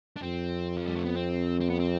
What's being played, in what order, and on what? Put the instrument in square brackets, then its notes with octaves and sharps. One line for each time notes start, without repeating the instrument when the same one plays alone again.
[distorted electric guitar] D4
[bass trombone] F2 [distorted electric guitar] C4
[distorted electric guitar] F3
G3
A3
B3
C4
C4
B3
C4